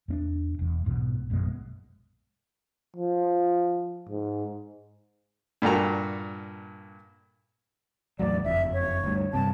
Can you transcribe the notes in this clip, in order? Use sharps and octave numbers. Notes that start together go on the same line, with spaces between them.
E2 C4 D4
E1 E2
B1 G#2 B2
A#1 F#2 B2 G#3
F3
G#2
G2 A#2 F#4 A4 A#5
E2 A2 F#3 D5
F#1 F2 E5
C#5
D2 G2
G2 C3 A5